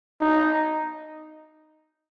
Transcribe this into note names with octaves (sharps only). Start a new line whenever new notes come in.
D#4